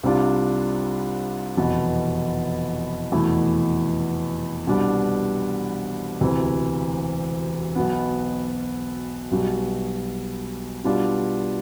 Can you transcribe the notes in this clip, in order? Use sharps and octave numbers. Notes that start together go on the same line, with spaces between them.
C2 C3 G3 D4 F4
F1 E2 B2
F1 E2 B2 A3 E4
C2 B2 G3 D4
E1 D2 C3 E3
B1 B2 B3
B1 B2 G3
B2 G3 D4 F4